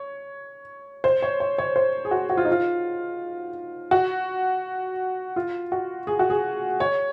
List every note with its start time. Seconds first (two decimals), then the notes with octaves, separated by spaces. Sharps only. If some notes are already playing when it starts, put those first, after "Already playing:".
Already playing: C#5
1.04 C5
1.22 C#5
1.40 C#5
1.58 C#5
1.76 C5
2.05 G#4
2.11 F#4
2.29 F#4
2.37 F4
2.45 D#4
2.52 F4
3.91 F#4
5.36 F4
5.72 F#4
6.07 G#4
6.19 F#4
6.30 G#4
6.80 C#5